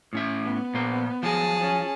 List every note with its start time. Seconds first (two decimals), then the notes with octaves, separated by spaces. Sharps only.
0.13 A2 C#4 E5
0.44 B3
0.74 A#2 A#3 C5
1.23 F3 F#3 G#4 A5
1.60 C#4